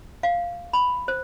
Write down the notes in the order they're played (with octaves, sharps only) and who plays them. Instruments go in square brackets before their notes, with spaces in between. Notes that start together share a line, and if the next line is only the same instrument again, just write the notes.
[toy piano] F5
B5
C5